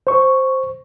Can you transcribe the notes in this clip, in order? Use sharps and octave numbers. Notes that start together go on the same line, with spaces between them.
C5 C#6